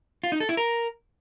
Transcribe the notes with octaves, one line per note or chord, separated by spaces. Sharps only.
F4
D#4
A4
E4
A#4